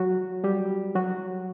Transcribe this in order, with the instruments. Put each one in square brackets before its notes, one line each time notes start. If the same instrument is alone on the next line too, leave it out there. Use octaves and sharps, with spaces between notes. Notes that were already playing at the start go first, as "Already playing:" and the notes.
Already playing: [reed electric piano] F#3 F#4
G3 G4
F#3 F#4